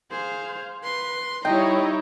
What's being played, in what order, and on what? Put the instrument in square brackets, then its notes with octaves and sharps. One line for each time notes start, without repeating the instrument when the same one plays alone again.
[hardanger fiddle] G#4 [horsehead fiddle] C5 F5
[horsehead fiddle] B4 [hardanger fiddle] C6
[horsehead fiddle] G3 D#5 [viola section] D#4 E4 C#5 [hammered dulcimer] G5 [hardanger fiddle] A#5